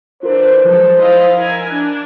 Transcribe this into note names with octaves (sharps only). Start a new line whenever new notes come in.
E3 D4 F4 A#4 C5
F3 F#3 G#3 A4
E4 D#5 F5
E4 A#4 G#5
D4 F#6